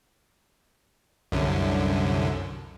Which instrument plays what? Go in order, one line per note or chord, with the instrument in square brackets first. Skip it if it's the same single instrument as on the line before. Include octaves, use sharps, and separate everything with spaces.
[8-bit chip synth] C2 F#2 D3